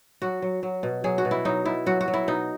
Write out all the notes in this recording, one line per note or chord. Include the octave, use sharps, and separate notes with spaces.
F#3 F#4
F#3
F#3
B2
F#3 G#4
F#4
B2
E4
F#3 D#4
B2 E4
F#3 F#4
F#4
F#3
E4
B2 D#4